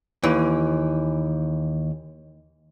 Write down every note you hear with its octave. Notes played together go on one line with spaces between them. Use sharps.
D#2 E3